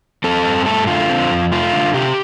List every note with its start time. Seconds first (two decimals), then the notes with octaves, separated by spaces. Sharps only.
0.24 C4 A4
0.45 G2
0.66 A3 A4
0.87 D3 F4
1.09 C4
1.30 F2
1.52 A3 F4
1.73 D3
1.94 C3 G4